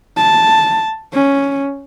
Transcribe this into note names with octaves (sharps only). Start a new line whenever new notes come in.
A5
C#4